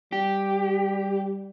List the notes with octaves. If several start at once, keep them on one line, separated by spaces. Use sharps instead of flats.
G3 G4